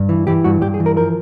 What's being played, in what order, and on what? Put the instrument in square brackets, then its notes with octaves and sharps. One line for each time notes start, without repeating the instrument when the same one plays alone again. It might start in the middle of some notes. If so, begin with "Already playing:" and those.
Already playing: [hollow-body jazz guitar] G2
E3
E3 G4
G2 F#4
G2 G4
G#4
E3
A#4
F3 A#4